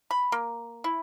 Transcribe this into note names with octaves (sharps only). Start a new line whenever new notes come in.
B5
A#3
E4